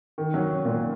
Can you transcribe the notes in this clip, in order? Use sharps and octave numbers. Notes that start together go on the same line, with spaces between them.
D#3
F#3
A#2